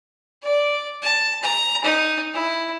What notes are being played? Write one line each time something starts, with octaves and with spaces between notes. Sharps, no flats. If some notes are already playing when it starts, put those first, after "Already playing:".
D5
A5
A#5
D#4
E4